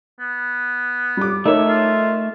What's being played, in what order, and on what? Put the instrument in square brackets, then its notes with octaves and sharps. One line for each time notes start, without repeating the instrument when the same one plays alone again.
[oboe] B3
[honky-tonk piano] G3 D6
[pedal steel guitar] A3 E5 [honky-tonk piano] D#4 A#4 C#5
[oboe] F4